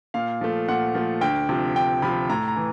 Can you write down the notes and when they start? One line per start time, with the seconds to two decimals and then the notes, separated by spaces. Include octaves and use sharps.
0.14 A#2 F5
0.41 F3 A3
0.68 A#2 F#5
0.95 F3 A3
1.21 D2 G5
1.49 C3 F3
1.76 D2 G5
2.02 C3 F3 B5
2.30 A2 A#5
2.48 A#5
2.56 E3